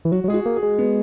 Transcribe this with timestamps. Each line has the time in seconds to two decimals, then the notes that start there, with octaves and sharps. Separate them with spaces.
0.05 E3
0.12 F#3 F#4
0.24 F#3
0.28 G#3 G#4
0.34 F#4
0.46 A#3
0.56 G#4
0.63 G#3
0.79 B3